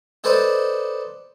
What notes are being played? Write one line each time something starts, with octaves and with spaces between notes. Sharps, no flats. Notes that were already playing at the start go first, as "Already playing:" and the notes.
D#4 A4 B4 C5 D5 D#5